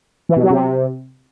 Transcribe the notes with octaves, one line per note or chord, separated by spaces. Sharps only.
E3
B2
F#3
C3